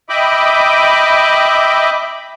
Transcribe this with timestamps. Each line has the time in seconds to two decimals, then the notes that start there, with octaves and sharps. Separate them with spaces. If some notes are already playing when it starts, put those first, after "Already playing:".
0.09 D#5 E5 G5 B5 D6